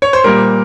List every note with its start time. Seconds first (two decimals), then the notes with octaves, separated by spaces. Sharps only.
0.02 C#5
0.13 C5
0.24 A#2 G3 A#4